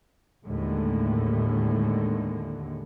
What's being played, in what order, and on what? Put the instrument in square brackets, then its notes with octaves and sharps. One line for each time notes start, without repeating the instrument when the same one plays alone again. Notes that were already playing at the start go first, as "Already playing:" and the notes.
[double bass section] D#2 A2 D3 G#3